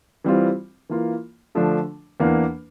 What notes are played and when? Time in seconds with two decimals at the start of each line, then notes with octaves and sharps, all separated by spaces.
0.24 E3 G3 C4 F4
0.89 E3 A#3 F4
1.55 D3 F3 A3 D4
2.20 E2 E3 A#3 D4